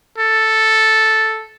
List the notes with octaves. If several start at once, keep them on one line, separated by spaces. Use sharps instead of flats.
A4